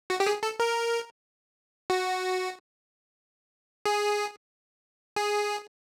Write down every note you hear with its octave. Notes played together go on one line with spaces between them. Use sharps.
F#4
G4
G#4
A4
A#4
F#4
G#4
G#4